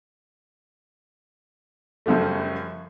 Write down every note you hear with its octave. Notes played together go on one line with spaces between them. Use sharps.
F#2 C#3 F3 G3 A3